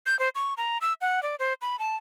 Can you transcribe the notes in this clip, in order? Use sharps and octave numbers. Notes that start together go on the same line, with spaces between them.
G6
C5
C#6
A#5
E6
F#5
D5
C5
B5
A5